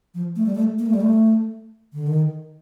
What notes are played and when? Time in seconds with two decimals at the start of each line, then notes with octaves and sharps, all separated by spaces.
0.14 F3
0.36 A3
0.46 G3
0.55 A3
0.79 A#3
0.86 A3
0.93 G3
1.01 A3
1.93 D3
2.07 D#3